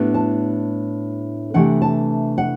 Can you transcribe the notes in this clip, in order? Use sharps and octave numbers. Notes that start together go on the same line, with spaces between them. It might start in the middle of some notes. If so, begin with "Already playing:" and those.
Already playing: A2 G3 B3 D4
A5
C3 E3 A3 D4 F#5
A5
F#5